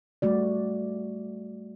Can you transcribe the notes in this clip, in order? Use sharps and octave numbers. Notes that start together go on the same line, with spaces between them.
G3 A3 F#4 D5